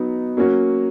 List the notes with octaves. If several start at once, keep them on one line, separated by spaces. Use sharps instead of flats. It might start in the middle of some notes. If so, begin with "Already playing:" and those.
Already playing: F#3 B3 D#4
F#3 A#3 C#4 F#4